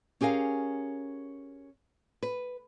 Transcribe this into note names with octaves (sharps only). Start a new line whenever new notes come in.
C#4 G4 G#4 A#4 F5
B4